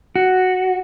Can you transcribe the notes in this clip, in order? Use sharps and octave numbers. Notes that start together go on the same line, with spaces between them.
F#4